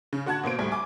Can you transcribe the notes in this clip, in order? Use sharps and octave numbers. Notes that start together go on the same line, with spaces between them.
C#3
D3 F#4 F#5 A5 G#6
B2 A#3 C5 D7
D2 A2 G3
G#5 D6